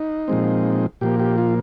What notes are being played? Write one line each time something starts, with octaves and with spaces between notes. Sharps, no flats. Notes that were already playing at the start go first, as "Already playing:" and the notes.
Already playing: D#4
A#2 F3 G#3 C4
A#2 F3 A#3 G4
G4
F4